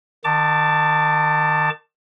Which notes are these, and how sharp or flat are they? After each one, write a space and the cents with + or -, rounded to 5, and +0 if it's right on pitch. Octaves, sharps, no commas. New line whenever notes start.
D#3 -30 A5 +15 D6 -20